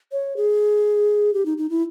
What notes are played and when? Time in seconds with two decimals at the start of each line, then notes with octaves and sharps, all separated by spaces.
0.12 C#5
0.37 G#4
1.34 G4
1.46 D#4
1.58 D#4
1.70 E4